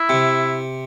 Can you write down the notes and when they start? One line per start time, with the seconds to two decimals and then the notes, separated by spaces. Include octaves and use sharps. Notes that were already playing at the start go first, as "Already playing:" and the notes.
Already playing: E4
0.09 C3